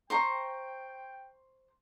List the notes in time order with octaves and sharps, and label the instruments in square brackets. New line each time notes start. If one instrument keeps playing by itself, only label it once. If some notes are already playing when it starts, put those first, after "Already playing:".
[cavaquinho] C5 A#5 C#6 [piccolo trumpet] G5